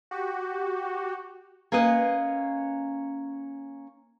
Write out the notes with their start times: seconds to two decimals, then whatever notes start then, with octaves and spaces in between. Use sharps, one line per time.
0.11 F#4 G4
1.72 A#3 C#4 B4 D#5